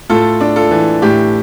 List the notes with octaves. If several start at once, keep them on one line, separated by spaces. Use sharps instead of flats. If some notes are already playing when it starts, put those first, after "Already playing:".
A2 F4 A4
D4
F4 A4
E3
A2 G4